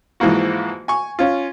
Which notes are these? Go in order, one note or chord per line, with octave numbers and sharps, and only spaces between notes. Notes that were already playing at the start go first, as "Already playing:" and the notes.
G#2 E3 F3 A#3 F#4
G#5 C#6
C#4 F4